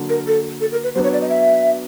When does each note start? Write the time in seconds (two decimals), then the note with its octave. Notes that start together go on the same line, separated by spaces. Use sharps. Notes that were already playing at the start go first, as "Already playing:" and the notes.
Already playing: D3 F#3 A#3
0.09 A#4
0.27 A4
0.61 A4
0.72 A#4
0.84 B4
0.95 F#3 B3 D4 C5
1.04 C#5
1.13 D5
1.21 D#5
1.29 E5